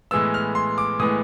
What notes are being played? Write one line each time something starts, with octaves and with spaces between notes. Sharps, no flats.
A2 E3 G#3 B3 E6
F6
C6
D6
A2 E3 G#3 B3 D#6